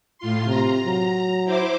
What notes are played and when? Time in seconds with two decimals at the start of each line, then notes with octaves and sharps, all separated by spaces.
0.18 A2 F4 C6
0.47 C3 A#5
0.86 F#3
1.45 E4 C5 D6